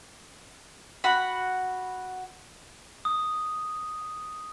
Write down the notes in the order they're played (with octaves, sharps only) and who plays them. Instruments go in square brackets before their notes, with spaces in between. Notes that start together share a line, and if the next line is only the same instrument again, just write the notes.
[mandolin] F#4 F#5 B5
[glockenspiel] D#6